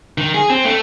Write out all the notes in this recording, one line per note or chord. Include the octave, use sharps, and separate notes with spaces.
D#3
G#4
C4
A3